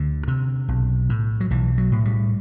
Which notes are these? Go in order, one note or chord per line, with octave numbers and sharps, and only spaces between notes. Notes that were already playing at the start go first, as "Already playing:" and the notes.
Already playing: D2 D3
C3
B1
A2
F#3
B1 E3
F#3
A2
G3